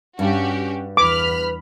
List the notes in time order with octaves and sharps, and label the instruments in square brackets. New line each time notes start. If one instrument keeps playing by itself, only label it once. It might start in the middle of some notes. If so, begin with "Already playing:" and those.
[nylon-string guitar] G2 [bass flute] C#4 [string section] F#4 G4
[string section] E2 B5 F6 [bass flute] B4 [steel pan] D6